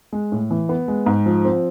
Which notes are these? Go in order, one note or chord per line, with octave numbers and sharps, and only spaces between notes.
G#3
A2
E3
B3
G#3
G#2
F3
C4